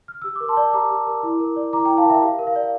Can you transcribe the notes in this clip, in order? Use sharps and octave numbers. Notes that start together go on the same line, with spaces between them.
F6
G4 E6
A#4 D6
A5 C6
D5
G4 A#5 D6
G4
A#4
E4
A#4
D5
E4 A#5 D6
E4 G5 A#5
F5 A5
A#4 E5 G5
G4 F5
A#4
F5
D5
F5